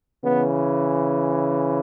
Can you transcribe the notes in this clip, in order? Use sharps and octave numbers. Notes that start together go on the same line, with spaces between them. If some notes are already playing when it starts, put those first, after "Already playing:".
C#3 E3 B3